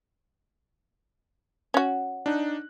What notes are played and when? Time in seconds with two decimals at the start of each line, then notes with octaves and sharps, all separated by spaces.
1.74 C#4 F#4
2.26 D4 D#4 F#6